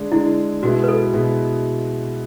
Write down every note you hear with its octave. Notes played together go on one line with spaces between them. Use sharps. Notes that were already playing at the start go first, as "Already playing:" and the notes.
Already playing: D3 G#3 D4
D3 G#3 D4 E4
B2 G#3 B3 E4 F#4
B4
A4
B2 G#3 B3 E4